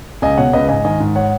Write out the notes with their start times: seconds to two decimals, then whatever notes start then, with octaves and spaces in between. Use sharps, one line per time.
0.22 C#2 D#5 G#5
0.38 B2 C#5 F#5
0.53 C#2 B4 D#5
0.69 G#2 D#5 G#5
0.84 D#3 D#5 G#5
1.00 G#2
1.16 C#5 F#5